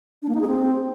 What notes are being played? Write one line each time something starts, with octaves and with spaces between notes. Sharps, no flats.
D4
A#3
D#4
G#4
C4